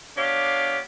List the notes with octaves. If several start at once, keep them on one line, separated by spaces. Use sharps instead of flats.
B3 D4 G4 C#5 F5